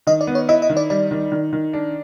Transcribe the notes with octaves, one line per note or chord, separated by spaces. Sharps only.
D#3 D#5
D5
B3
C#5
E4 D#5
D#5
D#3
D5
G3 D5
D#3
D#3
D#3
D4